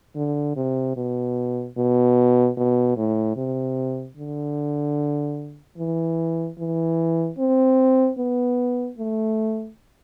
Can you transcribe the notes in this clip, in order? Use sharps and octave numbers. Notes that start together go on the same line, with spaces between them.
D3
C3
B2
B2
B2
A2
C3
D3
E3
E3
C4
B3
A3